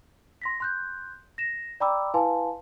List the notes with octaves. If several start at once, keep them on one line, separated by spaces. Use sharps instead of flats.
C6 A#6 B6
C6 F#6 G6
A#6 E7
D5 G5 A#5 B5 D6 E6
E4 B4 F5 G#5 A5 C6